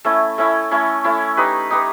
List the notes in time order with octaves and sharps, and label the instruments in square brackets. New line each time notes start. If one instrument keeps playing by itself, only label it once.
[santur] A3 C#4 E4
A3 C#4 E4
A3 C#4 E4
A3 C#4 E4
D#4 G4 B4
D#4 G4 B4